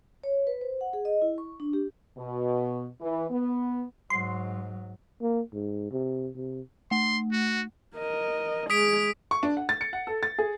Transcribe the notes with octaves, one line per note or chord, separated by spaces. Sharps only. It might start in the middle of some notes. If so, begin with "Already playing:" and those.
C#5
B4
C5
F#5
G#4
D#5
E4
C#6
D4
G4
B2
E3
B3
G#2 F#3 C6
A#3
G#2
C3
C3
A3 C6
F#4
A#4 D#5
G#3 G#4 D#6 B6 D7
C#6
D4
F#5
A6
C#7
F#5
A4
A6
G#4